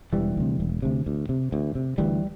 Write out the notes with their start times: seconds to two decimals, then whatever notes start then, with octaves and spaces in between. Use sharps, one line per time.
0.13 E1 E3 G3
0.37 D2 C3
0.60 E1
0.82 D2 C3
1.06 D2
1.29 C3
1.52 D2
1.75 C3
1.98 D2 E3 G3